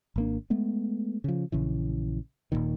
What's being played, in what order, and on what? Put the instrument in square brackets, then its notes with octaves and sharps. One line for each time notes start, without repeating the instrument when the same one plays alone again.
[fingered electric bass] G#1 A#3 D4
G#3 A3 B3
C#3 F3
A#1 C#3 E3
D#1 B1 A#2 D#3